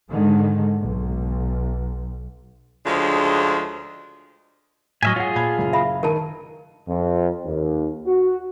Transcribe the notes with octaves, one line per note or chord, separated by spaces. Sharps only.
G#2 D3 D#3 G#3
B1
D2 C#3 F3 G#3 D4
A2 F#3 D#5 E5 G#5 C#6 F6 B6
F4 G#4 C#5 F#5
A#2 A5 B5 G#6
F#1
E5 F5 B5
D#3 A#4 A5 D#7
F2
D#2
F#4